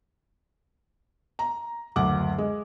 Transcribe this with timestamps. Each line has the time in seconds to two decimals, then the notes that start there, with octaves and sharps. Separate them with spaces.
1.39 A#5
1.96 F#1 D2 F#5 D6
2.38 G#3